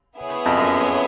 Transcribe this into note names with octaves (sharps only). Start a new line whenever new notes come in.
B3 E4 G#4 C#5
F2
F#2